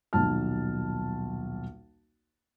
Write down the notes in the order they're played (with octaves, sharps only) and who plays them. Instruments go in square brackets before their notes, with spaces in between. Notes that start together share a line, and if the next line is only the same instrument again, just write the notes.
[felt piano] D#1 B1 A5 F6